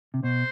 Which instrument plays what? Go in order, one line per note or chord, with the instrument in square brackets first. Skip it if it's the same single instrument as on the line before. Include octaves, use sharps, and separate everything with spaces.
[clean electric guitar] C3
[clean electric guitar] B2 [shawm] C5